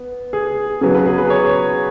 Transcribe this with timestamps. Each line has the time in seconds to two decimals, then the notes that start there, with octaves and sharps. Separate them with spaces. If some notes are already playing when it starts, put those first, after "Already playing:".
Already playing: B3
0.33 G#4
0.81 C#3 F#3 B3 G#4
0.95 B4
1.06 G#4
1.18 B4
1.30 C#5